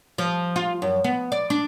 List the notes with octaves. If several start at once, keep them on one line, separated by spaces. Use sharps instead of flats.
F3
F4
F#2
B3
D5
D4